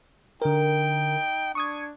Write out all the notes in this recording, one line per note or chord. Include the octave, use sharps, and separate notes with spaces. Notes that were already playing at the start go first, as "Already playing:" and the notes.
D3 D#4 A#4 G5
D4 C#6 D#6 G#6